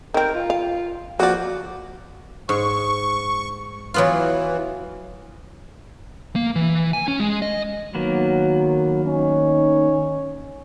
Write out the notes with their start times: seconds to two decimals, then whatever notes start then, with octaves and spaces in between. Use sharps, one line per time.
0.14 D#3 C4 A#4
0.35 F4
0.50 F5
1.20 F3 A#3 F#4 D5
2.49 G#2 C#6
3.94 E3 F#3 B3 F4
6.36 A#3
6.56 E3
6.93 G#5
7.08 C#4
7.20 G#3
7.42 D#5
7.95 D#3 F#3 A#3 B3
9.06 C#4 D#4